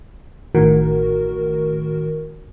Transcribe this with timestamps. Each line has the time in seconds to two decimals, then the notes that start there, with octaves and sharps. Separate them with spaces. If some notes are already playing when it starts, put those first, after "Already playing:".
0.55 A1 A2 D#3 F#4 A#4